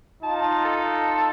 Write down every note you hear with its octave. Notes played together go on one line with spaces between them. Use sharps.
D#4 F4 A5
A4